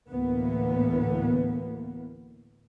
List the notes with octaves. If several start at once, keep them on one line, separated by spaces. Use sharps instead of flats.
D2 A2 E3 A#3 B3